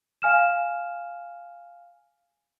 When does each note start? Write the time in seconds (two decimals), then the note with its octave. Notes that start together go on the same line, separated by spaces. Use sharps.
0.22 F5 G#5 F6 E7